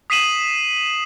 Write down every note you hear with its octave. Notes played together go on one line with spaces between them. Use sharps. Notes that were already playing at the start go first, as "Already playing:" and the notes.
D#6 B6 C7 D#7 E7 F#7